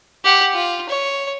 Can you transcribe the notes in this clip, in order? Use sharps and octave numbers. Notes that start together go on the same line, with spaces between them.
G4 F#5
F4
C#5